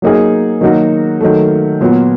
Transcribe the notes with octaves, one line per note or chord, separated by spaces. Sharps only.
F#3 A#3 D#4 G#4
D#3 F#3 A#3 D#4 F#4
D#3 F#3 A3
A#2 F#3 B3